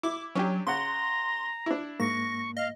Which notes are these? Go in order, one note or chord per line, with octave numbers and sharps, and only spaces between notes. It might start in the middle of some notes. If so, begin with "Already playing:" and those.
E4 D6
F#3 C#4 D4 G4
C#3 F#5 A#5 C6
D4 E4
G#2 A#3 C#6 A#6
D#5 F5